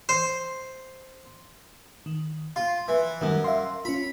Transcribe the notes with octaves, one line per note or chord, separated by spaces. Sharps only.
C5
D#3
F4 C6
E3
F#2 D#3 F#3 G3
E5 F5 C6
C#4 F4 B5